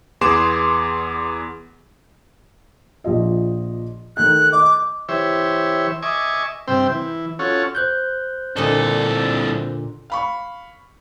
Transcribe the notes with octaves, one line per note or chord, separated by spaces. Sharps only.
E2 B3 G#4 C6 D6 E7
A#1 F3 D#5
D#3 A3 F#6 G6
D#5 D6
E3 G4 C5 C#5 E5
D#5 E5 G#5 C#6 D6
G2 C3 C4 C5 G5 E6
E3
C#4 F4 F#4 A4 C#5
C5 F#6 G6
C2 A#2 D3 A4 D#5
F5 B5 C#6